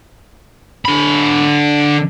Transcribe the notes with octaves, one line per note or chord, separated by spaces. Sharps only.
D3 B5